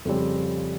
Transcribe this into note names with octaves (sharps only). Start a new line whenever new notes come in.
F2 C#3 G3 C4